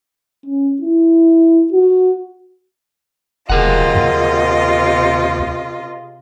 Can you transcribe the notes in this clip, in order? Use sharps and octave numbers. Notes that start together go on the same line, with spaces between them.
C#4
E4
F#4
E1 C3 F4 G#4 A#4 D#5 F#5
D#2